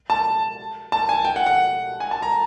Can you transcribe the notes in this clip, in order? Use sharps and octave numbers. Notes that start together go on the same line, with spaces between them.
A5
A5
G#5
G5
F#5
F#5
G#5
A5
A#5